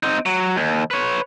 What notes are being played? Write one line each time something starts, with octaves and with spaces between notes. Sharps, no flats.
C4 D#4
F#3
D#2
B4 C#5